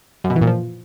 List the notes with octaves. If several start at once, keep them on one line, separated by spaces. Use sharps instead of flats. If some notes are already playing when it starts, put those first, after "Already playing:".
F#2
B2
E3
A#2
F3